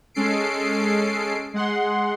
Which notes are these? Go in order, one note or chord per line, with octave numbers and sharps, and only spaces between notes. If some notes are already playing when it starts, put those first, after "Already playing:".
G#3 C#4 A4 C7 D7
G#3 F#5 C6